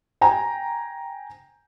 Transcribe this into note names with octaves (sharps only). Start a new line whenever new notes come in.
G5 G#5 A#5